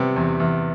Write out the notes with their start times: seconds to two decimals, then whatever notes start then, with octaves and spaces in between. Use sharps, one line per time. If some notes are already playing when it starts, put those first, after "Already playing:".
Already playing: C3 G3 B3
0.16 E2
0.40 E2